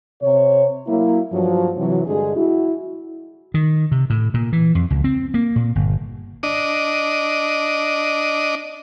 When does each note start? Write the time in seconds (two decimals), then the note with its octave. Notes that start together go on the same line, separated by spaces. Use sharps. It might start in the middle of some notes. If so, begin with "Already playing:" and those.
0.21 C3 C#5
0.87 F#3 A#3 E4
1.32 G2 F3 F#3
1.76 C3 E3 F#3
2.06 G2 D3 G#3 G#4
2.35 E4 F#4
3.54 D#3
3.92 C3
4.10 A2
4.34 A#2
4.53 E3
4.75 F2
4.90 C#2
5.04 C4
5.34 A#3
5.56 A#2
5.75 G1
6.43 D4 D#5